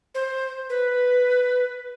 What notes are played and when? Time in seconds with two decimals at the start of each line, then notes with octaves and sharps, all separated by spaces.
0.15 C5
0.70 B4